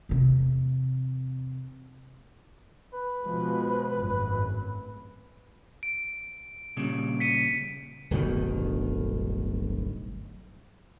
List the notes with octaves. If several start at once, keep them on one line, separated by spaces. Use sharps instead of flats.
E2 C3
B4
B2 F3 G#3
G#1 F#2 A2
D7
A#2 C#3 G3
B6 C#7 D#7
D1 G1 B2 D#3